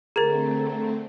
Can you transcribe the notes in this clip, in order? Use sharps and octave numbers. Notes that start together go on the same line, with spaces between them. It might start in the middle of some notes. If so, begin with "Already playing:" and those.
D3 A3 C4 G#4 A#4 A#5 G#6 A6